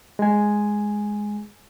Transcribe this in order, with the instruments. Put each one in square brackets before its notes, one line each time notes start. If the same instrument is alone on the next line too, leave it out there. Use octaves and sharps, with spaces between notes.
[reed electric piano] G#3 G#5